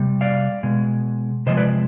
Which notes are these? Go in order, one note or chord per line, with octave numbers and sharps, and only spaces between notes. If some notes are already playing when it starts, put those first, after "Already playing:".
Already playing: C3 G3
D5 F5
B2 G#3
C3 F3 G#3 C5 D#5
B4 D5